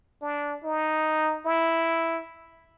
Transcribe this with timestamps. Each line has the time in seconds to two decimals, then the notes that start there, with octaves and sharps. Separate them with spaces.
0.21 D4
0.63 D#4
1.45 E4